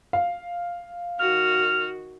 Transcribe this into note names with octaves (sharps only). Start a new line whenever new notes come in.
F5
D#3 F#4 F6